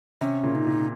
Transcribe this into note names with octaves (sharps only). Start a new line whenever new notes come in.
C3 C#4
A#2 C#3
D#4
A#2